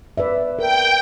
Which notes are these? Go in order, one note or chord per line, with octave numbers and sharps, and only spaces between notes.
B4 D5 E5
A#4 G5